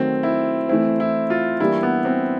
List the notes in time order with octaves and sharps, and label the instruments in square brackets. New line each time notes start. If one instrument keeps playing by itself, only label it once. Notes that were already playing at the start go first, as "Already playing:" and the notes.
Already playing: [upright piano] D#3 F#3 A3 [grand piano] C4
[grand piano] E4
[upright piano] E3 A3 C4 [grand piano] E4
[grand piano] E4
F4
[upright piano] E3 G3 A#3 D4 G4 [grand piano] E4
[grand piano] B3
C4